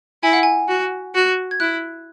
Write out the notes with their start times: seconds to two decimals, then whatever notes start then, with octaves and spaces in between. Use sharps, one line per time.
0.23 E4 G#5
0.33 F#5
0.43 G#5
0.68 F#4
1.15 F#4
1.51 G#6
1.60 E4 F#6